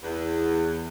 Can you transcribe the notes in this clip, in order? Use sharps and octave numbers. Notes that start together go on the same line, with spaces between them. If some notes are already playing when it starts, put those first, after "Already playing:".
E2